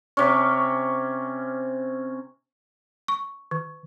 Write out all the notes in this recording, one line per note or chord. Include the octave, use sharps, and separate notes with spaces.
C3 C#4 C#6 D6 B6
C#6
D#3